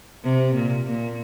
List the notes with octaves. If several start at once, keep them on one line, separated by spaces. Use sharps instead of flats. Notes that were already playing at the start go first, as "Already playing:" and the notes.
C3
A#2
A#2